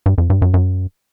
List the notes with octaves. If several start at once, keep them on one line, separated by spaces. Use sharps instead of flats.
G2
F2
G2
F#2
F#2